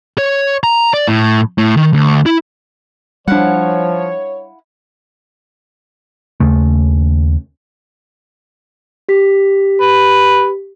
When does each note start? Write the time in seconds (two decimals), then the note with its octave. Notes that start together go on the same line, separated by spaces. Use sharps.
0.18 C#5
0.63 A#5
0.94 D5
1.08 A2
1.58 A2
1.77 D#3
1.93 D2
2.26 E4
3.28 F3 G3 D4 E4 C#5 F5 F#5
6.40 D#2 C#3 A3
9.09 G4 B6
9.81 B4